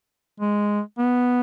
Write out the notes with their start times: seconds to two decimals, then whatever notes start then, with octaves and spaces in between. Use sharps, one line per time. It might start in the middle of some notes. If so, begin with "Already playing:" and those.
0.40 G#3
0.98 B3